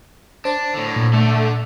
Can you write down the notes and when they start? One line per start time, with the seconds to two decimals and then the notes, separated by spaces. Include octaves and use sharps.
0.45 D4 C5
0.74 A2 D3
0.96 A#2
1.13 D3 A3